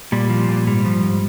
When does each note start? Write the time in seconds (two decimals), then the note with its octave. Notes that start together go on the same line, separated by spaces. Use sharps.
0.12 A#2 G3
0.30 F3
0.49 A#2
0.67 G#2 G3
0.85 F3
1.03 G#2